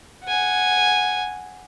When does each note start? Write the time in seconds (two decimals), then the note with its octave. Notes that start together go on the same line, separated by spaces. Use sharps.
0.24 F#5 G#5